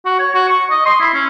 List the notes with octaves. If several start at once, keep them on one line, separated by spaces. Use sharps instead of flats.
F#4
C#5
F#4
C#6
D#5
C6
E4
C#4